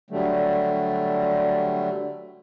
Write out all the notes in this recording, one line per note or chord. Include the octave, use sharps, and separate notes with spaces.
D3 F#3 G3 A3